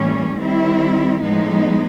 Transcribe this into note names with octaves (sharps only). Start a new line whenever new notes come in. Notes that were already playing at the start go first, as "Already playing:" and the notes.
Already playing: A2 E3 G3 A#3 C#4
D#3 G3 C4 E4
A2 F3 G#3 B3 D#4